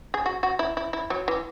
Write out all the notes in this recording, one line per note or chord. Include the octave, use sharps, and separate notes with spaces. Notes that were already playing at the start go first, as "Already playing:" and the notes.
G#4
F#4
F#4
E4
E4
E4
F#3
E3